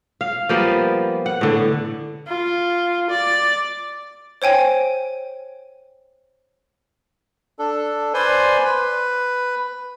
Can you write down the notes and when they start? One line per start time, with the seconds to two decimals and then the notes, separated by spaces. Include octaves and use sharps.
0.21 F5
0.49 F3 G3 A#3 B3
1.26 F#5
1.41 A2 D3
2.27 F4
3.10 D5
4.42 C5 C#5 G5 G#5
7.59 D4 A4
8.14 B4 C5 D5 G#5 C6
8.65 B4